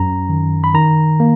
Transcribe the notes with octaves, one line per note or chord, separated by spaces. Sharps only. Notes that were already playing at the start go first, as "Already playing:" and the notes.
Already playing: F#2 A#5
D#3
B5
D#3 A#5
A#3